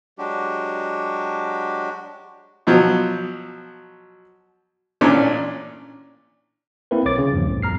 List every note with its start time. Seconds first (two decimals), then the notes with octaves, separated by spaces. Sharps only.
0.18 F#3 G#3 D4 F#4 G4
2.67 B2 F3 F#3
5.01 A1 A#2 C#4 D4
6.91 A#3 C4 E4 A#4 B4
7.05 B1 C#5 D6 A6
7.18 C#3
7.32 E2 G2 F3
7.45 C2 A2
7.62 G#1 F2 A#5 F6 C7